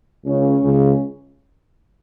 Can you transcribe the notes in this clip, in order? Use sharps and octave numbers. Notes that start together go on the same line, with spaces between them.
C#2 C#3 C#4
C#2 C#3